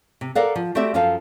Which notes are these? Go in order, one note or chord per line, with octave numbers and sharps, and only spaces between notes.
C3
A4 A#4 D5 F5 F#5
F3
A3 C4 F#4 G4 D5 E5
F#2 F3 F4 A4 F5 A5